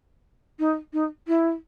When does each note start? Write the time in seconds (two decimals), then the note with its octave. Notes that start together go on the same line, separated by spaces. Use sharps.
0.59 D#4
0.93 D#4
1.28 E4